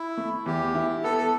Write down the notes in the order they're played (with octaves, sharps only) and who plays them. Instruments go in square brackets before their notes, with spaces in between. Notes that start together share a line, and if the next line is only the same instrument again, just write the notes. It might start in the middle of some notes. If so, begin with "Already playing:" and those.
Already playing: [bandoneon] E4
[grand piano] A3
[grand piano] E2 [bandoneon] G4
[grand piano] E4
[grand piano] B3 [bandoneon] A4
[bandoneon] A4